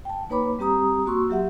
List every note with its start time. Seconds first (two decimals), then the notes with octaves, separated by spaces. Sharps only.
0.05 G5 A5
0.30 A#3 D#4 B4 C#5 B5 D6
0.59 G3 C4 G4 A#5 D#6
1.06 A#3 F#4 C6 C#6 E6
1.29 F#3 G4 E5 F#5